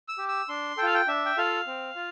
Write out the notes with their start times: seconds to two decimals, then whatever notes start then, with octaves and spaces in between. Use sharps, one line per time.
0.08 E6
0.18 G4
0.28 E6
0.49 D4 C6
0.77 A4 G5
0.82 F4 F5
0.94 G5
1.07 D4 E5
1.26 G5
1.37 F4 A4 F5
1.67 C4
1.96 F4